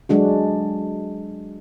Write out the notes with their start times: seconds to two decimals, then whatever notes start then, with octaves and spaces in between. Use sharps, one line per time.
0.09 F#3 G#3 D4 F#4